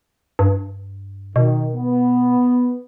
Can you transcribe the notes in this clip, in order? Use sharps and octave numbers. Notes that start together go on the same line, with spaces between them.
G2
B2 D#3
B3